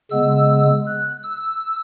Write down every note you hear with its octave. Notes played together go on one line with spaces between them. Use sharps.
C#3 G#3 B3 E6
F#6
E6